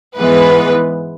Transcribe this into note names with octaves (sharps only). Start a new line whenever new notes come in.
G#2 E3 G#3 B3 B4